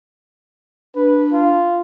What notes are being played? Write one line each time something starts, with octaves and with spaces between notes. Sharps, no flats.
D4 B4
F4